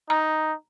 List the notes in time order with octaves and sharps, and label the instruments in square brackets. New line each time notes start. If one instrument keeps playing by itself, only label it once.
[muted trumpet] D#4 [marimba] A#5